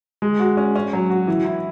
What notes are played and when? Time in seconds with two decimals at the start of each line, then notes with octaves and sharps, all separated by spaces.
0.22 G#3
0.40 F#4
0.57 C#4
0.76 C#4
0.93 F#3
1.10 F#4
1.27 E3
1.45 E4